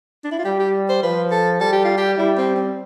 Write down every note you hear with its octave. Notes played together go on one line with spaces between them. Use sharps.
D4
E4
F4
G3 G4
G4
C5
F3 B4
A4
G3 A4
G4
F4
G4
G3 E4
C4
C4